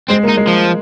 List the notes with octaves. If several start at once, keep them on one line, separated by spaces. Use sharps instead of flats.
G#3 C4
A#3
D#4
G#3
F3